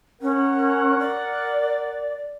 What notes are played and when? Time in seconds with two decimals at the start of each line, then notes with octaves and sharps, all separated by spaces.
0.22 C#4 A#4 F#5
0.99 D5